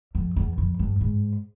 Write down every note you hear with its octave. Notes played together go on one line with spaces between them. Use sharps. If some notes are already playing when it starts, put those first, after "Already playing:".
F2
E2
F2
G2
G#2